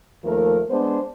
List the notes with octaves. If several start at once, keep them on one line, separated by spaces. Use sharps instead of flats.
D#2 F3 A3 A#4
G#3 B3 D4 C5